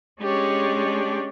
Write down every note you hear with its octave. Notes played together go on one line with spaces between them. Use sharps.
G#3 C#4 D4 G4 C#5 D5